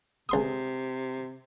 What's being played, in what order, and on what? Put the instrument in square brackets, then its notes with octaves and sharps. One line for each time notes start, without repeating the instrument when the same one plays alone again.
[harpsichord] C#2 C6 D#6 [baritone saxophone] C3